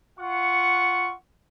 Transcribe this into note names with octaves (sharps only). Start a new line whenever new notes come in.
F4 F#5 C#6